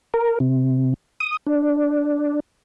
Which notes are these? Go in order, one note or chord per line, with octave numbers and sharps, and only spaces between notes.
A#4
C3
D#6
D4